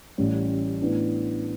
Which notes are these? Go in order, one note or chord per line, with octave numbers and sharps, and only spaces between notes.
A1 A2 G3 C#4
A2 E3 B3 D4